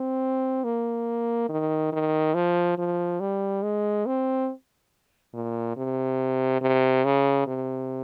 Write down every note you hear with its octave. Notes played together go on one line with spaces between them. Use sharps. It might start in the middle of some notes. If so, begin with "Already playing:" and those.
Already playing: C4
A#3
D#3
D#3
F3
F3
G3
G#3
C4
A#2
C3
C3
C#3
C3